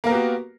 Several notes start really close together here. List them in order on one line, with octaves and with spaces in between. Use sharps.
A#3 A#4 B3 G4 F#4